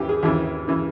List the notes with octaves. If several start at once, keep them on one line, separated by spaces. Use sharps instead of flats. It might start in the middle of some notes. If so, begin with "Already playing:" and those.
Already playing: D#2 C#3 E3 G4
G#4
D#2 C#3 E3
C#3 E3